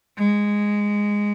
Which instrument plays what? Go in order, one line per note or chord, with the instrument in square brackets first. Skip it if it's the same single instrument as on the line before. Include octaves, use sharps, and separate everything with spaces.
[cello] G#3